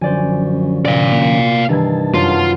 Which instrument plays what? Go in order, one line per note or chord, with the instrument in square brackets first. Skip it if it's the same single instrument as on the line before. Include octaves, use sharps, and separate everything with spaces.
[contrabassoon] F#2 [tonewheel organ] D3 F3 C#4 [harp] C5 D5 G#5
[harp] C3 [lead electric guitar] D5 F5
[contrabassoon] A#2
[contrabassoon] G2 [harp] D#3 E3 G#6 [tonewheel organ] A5
[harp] F#2 [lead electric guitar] F4